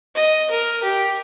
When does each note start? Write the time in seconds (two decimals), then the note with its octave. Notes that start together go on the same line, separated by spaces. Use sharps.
0.16 D#5
0.51 A#4
0.83 G4